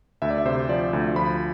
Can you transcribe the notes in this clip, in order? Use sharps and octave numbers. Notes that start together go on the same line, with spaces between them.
D2 E5
D5
E5
C3 C5
F3 D5
D2
F3 B5